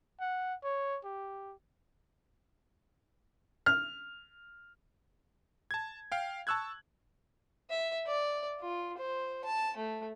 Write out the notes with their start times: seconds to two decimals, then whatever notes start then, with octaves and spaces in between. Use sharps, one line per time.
0.20 F#5
0.64 C#5
1.05 G4
3.66 F6
5.71 A5 G#6
6.12 F5 G5
6.47 A5 C#6 E6 F#6 G#6
7.70 E5
8.07 D5
8.60 F4
8.98 C5
9.45 A5
9.77 A3